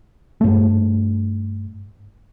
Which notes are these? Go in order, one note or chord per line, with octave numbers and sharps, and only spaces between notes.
G2 A3